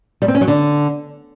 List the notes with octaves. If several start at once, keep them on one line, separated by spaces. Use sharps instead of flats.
G3
C4
C#4
F#3
D3